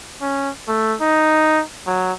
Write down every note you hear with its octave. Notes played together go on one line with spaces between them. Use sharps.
C#4
A3
D#4
F#3